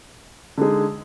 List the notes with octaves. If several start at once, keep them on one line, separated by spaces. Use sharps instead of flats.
D3 G#3 D#4 G#4